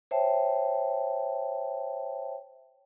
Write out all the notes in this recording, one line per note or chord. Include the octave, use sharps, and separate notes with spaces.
C5 C#5 E5 G5 A5